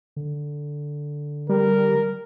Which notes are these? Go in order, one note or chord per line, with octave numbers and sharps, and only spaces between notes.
D3
G3 A#4